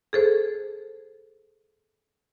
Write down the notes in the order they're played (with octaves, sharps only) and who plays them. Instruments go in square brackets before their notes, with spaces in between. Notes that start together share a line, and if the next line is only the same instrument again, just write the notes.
[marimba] G#4 A4 C5